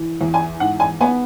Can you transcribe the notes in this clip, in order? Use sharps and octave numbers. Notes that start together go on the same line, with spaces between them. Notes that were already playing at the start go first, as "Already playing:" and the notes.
Already playing: E3
E2
G#5
G#2 F#5
G#5
B3 G#5